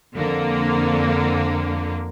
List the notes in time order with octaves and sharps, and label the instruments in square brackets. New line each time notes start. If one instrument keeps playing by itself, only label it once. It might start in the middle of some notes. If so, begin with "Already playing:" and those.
[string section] F2 D3 A#3